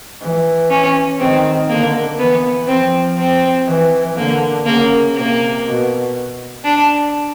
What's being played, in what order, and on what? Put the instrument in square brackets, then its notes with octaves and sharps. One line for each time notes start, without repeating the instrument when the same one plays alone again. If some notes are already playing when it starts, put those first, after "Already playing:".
[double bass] E3
[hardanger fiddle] C#4
[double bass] D#3 [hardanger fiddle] C4
[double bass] D3 [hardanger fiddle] A#3
[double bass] E3 [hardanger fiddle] B3
[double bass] F3 [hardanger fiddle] C4
[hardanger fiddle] C4
[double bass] E3
[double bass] D3 [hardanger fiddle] A#3
[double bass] C#3 [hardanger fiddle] A#3
[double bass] C3 [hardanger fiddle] A#3
[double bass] B2
[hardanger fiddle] D4